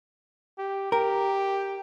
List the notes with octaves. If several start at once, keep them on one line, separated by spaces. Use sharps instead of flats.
G4
G4 A#4